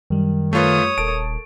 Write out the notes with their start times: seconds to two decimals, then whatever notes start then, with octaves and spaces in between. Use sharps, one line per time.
0.10 F#2 D#3 G3
0.53 A3 F4 B4 C#5 D#6
0.98 D#1 A4 A#4 A5 D7